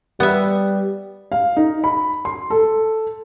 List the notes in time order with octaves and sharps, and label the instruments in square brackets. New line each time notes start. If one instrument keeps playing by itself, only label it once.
[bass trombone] G3 [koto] B3 E5
[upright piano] F5
D#4
B5
C6
A4